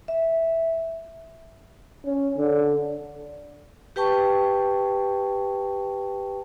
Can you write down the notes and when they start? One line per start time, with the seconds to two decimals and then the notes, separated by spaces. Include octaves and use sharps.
0.08 E5
2.06 C#4
2.38 D3
3.96 G4 B4 G5 A5 C#6